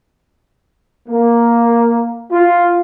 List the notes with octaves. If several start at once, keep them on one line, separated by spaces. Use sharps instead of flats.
A#3
F4